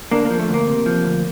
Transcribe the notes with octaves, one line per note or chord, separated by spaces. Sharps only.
D3 A#3 D4
A#3
F3
A3
D2 A#3
C3
F3
D2